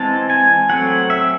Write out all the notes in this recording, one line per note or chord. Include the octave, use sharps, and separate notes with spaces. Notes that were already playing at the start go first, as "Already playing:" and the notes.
Already playing: E3 G#3 C4 A5
G#5
F#3 A3 C4 F#5
E5